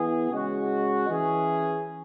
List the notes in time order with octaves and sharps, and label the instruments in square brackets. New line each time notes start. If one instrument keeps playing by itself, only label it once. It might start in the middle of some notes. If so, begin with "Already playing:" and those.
Already playing: [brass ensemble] E3 B3 E4 G#4
C#3 G#3 C#4 F#4
E3 C#4 G#4